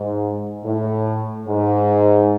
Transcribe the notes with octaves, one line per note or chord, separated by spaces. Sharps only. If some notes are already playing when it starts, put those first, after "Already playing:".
Already playing: G#2
A2
G#2